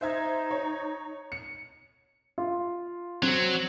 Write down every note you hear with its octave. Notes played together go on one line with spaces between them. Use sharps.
D#4 C5 E5 G#6
C#5
C#7
F4
F#3 C4